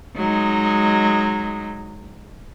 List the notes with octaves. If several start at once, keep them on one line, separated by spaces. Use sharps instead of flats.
F#3 G#3 D#4